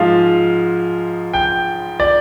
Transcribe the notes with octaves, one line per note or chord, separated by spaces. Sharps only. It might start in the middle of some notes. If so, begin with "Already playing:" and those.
Already playing: G#2 F3 G#3 F5
G5
D5